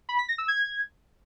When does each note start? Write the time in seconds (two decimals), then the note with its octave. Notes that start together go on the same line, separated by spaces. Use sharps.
0.09 B5
0.19 B6
0.28 A#6
0.38 E6
0.48 G#6